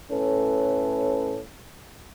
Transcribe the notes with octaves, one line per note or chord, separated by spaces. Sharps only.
A2 C#4 A4 B4